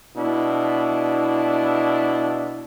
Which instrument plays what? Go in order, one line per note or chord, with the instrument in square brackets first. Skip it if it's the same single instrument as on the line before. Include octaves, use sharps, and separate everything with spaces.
[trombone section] B2 D4 E4